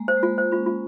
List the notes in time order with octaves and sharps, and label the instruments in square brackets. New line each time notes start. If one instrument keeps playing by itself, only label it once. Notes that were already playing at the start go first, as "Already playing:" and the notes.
Already playing: [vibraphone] G#3 A#3
[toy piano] C5
[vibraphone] G#3
[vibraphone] A#3 [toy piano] F4
[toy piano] C5
[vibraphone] C#4 [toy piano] F4
[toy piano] F4